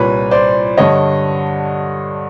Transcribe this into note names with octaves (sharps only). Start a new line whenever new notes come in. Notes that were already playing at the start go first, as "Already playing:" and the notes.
Already playing: C2 A#2 B4 C#5
C5 D5
G2 D3 C#5 D#5